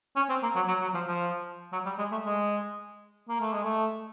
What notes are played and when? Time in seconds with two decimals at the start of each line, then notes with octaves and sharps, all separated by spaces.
0.16 C#4
0.29 C4
0.43 A#3
0.55 F#3
0.68 F#3
0.82 F#3
0.95 F3
1.08 F3
1.72 F#3
1.86 G3
1.98 G#3
2.12 A3
2.25 G#3
3.29 A#3
3.41 A3
3.53 G#3
3.65 A3